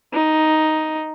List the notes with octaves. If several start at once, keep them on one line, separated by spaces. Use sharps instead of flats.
D#4